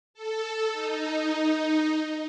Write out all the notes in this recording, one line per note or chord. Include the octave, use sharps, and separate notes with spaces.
A4
D#4